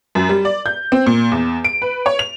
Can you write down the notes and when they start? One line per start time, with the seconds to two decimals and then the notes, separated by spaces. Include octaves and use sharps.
0.15 F#2
0.29 G3
0.45 D5
0.66 G6
0.92 C4
1.06 A#2
1.32 E2
1.64 D7
1.82 B4
2.06 C#5
2.19 F7